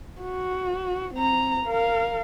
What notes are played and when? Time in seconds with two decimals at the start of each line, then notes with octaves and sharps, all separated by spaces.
0.21 F#4
1.14 C4 A#5
1.66 A#4 F5